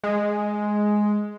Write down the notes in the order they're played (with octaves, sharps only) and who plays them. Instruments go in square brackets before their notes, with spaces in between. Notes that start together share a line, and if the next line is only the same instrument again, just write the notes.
[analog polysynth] G#3